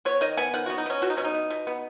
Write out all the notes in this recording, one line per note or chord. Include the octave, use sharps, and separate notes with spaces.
B3 C#5
D#3 D#5
B3 G#5
D#3 F#5
B3 F#4
D#4
B3 C#4
B2 F#4
D#4
B2 C#4
D#4
B3
B2
B3